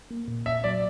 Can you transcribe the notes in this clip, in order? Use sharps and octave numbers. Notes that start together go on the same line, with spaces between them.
A#3
A#2
A#2 E5
F#3 D5